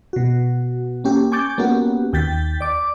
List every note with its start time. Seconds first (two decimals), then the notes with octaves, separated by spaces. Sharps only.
0.13 B2 F#4
1.04 A#3 C#4 G4
1.32 G#5 C#6 D6 G6 A6
1.58 A#3 B3 C#4 F#4 G4
2.13 D#2 G5 G6 A6 B6
2.61 D5 D6